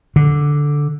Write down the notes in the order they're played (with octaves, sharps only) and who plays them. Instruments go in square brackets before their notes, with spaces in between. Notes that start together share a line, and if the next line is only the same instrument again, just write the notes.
[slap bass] D3